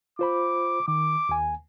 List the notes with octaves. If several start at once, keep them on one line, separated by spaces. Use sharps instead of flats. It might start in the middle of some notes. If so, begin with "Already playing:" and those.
F4 C5 B5 D6
D#3 D6
D#2 G#5